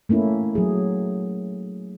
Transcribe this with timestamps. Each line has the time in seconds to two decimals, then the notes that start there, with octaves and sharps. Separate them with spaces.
0.09 A3 A#3 C#4 E4
0.55 F#3 G#4